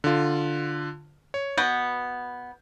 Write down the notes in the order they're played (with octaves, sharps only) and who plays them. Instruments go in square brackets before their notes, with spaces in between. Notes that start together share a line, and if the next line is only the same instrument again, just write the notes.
[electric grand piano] D3 F4
C#5
[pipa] B2 B3 [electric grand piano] G6